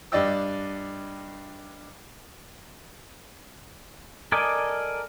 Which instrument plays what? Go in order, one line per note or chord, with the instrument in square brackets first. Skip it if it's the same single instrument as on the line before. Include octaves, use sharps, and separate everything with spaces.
[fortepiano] G2 D4 D5 D#5 G5 E6
[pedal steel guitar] A4 A#4 D5 D#5 G#5